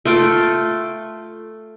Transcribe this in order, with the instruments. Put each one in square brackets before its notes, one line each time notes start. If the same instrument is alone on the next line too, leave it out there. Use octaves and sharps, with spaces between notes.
[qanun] A3 F4 A4 G5